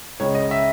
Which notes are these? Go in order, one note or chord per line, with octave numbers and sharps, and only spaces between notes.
C#2 C#3 G#3 C#5
D#5
E5